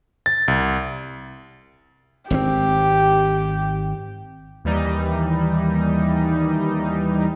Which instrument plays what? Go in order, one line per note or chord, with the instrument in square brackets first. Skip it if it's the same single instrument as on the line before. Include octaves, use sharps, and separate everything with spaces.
[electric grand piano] A6
C2
[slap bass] G#1 D#3 C4 [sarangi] G4
[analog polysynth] D#2 E3 G3 D#4